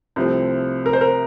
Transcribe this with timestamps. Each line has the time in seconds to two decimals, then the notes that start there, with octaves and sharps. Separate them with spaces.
0.16 C2 C3 F3 A3 C4
0.86 A#4
0.93 C5
1.01 A#4